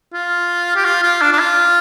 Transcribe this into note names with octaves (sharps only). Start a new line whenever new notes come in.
F4
G4
F4
F4
D4
D4
F4